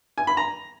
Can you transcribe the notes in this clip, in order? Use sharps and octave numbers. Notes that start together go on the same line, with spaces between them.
G#5
B5
A#5